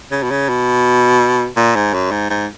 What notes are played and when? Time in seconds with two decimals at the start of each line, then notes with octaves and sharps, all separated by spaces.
0.11 C#3
0.23 B2
0.31 C#3
0.49 B2
1.57 A#2
1.75 G#2
1.94 F#2
2.11 G#2
2.30 G#2